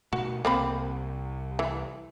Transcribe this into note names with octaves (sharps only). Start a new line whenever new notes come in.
B2 A3 F#4
C2 A#3 C4 B5
E3